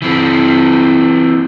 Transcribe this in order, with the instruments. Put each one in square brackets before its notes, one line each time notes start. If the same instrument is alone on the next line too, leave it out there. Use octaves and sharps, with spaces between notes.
[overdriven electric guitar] E3 C4